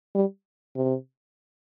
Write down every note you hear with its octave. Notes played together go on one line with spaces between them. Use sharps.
G3
C3